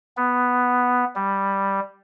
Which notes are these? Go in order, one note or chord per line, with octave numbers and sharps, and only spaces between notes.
B3
G3